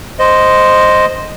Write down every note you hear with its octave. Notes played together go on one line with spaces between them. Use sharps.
C5 D#5